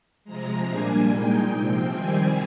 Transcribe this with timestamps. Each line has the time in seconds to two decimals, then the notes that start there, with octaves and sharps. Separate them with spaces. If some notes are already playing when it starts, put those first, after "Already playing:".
0.24 C3 F3 G#3 A#5
0.66 A#2 G3 A#3 D4 G#5
1.08 A#2 G#3 D#4 G5
1.49 C3 F3 C4
1.91 D#3 G3 C4 G#5